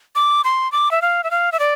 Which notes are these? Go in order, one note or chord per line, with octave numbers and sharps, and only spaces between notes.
D6
C6
D6
E5
F5
E5
F5
E5
D5